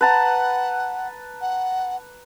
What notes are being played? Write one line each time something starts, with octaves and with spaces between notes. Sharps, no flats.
B4 F#5 A5 A#5
F#5